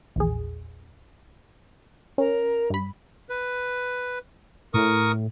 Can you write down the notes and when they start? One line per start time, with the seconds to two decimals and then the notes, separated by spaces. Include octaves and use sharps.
0.16 A#1 E2 G#4
2.18 C#4 A#4
2.70 G2 B5
3.29 B4
4.74 A2 A#4 C#6 D#6